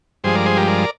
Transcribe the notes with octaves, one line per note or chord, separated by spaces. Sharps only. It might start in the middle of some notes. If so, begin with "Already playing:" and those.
G2 F3 G#3 G#4 C5
A#4 D5
G#4 C5
G4 A#4
A#4 D5